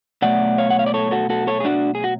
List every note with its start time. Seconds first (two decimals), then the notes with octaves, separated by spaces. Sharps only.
0.22 B2 F#3 A3 D5 F#5
0.58 C#5 F5
0.70 F#5
0.79 F5
0.86 D5
0.94 A4 C#5
1.11 F#4 A4
1.30 F#4 A4
1.47 A4 C#5
1.60 G#4
1.65 D4 F#4
1.95 G#4
2.04 F#4